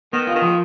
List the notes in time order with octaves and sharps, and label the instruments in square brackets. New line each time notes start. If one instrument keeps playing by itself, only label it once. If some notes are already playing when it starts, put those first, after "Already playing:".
[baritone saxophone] D#3 [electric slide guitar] B3
[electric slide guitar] F4
[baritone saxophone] D#3
[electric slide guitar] F3